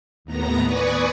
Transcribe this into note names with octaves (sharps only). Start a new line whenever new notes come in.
D#2 A2 B3 A#5 A#6
B4 D5 G#5 C#6 D#6